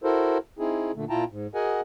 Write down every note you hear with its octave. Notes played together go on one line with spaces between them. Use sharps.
E4 F#4 A4 A#4 C5
C4 D#4 E4 G#4
A#2 D3 A3
A#2 E4 F4 G5 A5 A#5
G#2
F#4 G#4 A#4 D#5 F#5 G#5